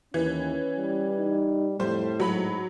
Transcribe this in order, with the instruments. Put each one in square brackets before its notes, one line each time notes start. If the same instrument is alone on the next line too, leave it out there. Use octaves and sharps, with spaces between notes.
[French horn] D#2 [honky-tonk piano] E3 [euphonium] C#4
[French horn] G3
[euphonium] D#4
[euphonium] F2 [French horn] A2 [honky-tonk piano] G3 C5
[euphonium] G#2 [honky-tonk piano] F#3 B5